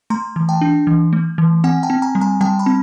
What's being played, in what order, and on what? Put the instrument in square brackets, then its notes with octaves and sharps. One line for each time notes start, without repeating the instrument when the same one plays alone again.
[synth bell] A3 A#5 C6
E3
G5 A5
D4
E3
A3
E3
C4 F#5 G#5
G5 A5
C4
G#5 A#5
G3
G#5 A#5
G3 G5 A5
A5 B5
C4